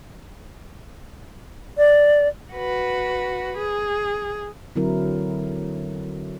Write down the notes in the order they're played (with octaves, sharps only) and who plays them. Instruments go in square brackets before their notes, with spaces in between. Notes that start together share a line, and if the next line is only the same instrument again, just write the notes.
[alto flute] D5
[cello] F#4 B4
G#4
[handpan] D3 F#3 C4 E4 A#4